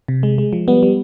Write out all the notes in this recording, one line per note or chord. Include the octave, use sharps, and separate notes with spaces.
C3
G#3
G#3
F3
G3 B3
G3